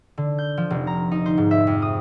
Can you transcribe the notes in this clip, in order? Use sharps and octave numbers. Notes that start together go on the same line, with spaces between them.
D3
G6
F3
F1
A#5
D#4
C5
G#2
E5
F2
D#6